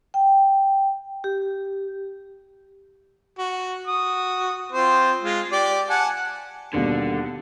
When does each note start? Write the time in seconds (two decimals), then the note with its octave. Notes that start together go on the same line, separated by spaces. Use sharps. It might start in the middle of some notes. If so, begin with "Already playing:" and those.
0.14 G5
1.24 G4
3.38 F#4
3.87 F#4 D#6
4.72 C4 F4 C5
5.23 G#3 F4
5.52 G4 D5
5.90 F#5 G#5 A5
6.74 D#2 B2 D3 G3